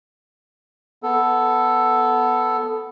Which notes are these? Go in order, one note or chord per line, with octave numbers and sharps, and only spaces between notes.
B3 A4